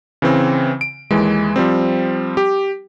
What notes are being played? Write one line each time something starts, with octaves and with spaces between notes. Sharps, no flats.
C#3 E3 C4
D7
D#2 E3 G#3
F3 G3 C4
G4